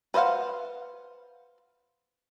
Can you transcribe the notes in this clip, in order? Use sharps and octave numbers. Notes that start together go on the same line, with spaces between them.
B4 C5 D#5 F5 F#5